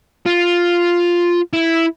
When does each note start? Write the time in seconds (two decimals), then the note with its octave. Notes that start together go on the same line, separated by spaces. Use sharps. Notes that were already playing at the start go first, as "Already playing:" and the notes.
0.26 F4
1.53 E4